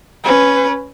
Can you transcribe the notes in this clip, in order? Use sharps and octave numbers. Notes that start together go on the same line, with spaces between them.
C#4 B4